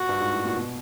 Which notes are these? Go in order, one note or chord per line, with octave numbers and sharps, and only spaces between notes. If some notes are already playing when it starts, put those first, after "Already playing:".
Already playing: A#2 F#4
G2
G#2
A2
A#2
B2